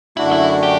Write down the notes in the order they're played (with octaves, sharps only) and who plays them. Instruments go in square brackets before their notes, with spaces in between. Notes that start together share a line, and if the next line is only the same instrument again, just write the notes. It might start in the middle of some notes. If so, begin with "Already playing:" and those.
[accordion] F#2 D3 A3 D4 F#4 [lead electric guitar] E4
[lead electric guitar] E4
G4